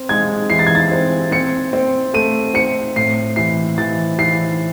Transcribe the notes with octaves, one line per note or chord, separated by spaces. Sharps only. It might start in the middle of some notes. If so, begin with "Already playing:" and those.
Already playing: C4
G#3 G#6
E3 C7
A6
G#6
A6
C4
C4 C#7
C4
A3 D#7
C4 C#7
A2 C7
E3 C7
E3 A6
E3 C7